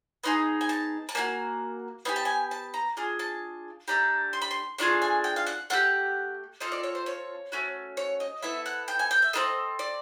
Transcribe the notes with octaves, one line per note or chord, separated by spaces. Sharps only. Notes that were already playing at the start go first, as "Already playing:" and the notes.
B3 D#4 G#4 C6
G#5
A5
A5
A#3 D#4 F#4 G#5
B3 D#4 G4 G#5
A5
G#5
A5
A#5
D4 F4 G#4
A5
A3 D4 G4 A#5
C6
B5
C6
A3 D4 F4 G#4 C#6
G#5
G5
F5
F#5
A3 D4 G4 F#5
C4 F4 A4 D#5
D5
C#5
C5
C#5
A3 C#4 F#4
C#5
D#5
B3 E4 A4 E5
F#5
G5
G#5
G5
E5
C4 E4 A4 D#5
D5